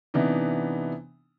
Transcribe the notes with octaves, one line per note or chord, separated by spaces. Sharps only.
C3 E3 B3 D4 D#4